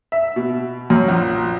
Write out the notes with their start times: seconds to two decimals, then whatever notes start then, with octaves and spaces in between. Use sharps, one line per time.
0.12 E5
0.36 B2
0.90 F#2
1.08 A#1